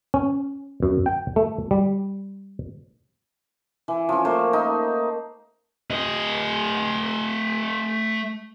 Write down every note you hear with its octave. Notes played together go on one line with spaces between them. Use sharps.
C#4
F#2
G5
A3
G3
E3
F3 C#4
A3 A#3 C5
D#4
A3 D#5